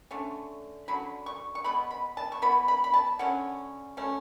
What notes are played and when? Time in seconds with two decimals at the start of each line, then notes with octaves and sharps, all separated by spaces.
0.11 D3 A3 C#4
0.88 D3 F#3 C#4 B5
1.26 C#6
1.55 C#6
1.64 B2 G#3 B3 B5
1.91 B5
2.17 A5
2.32 C#6
2.42 E3 B3 B5
2.68 B5
2.84 B5
2.94 A5
3.19 D3 F#3 C#4 F#5
3.97 B2 A3 C#4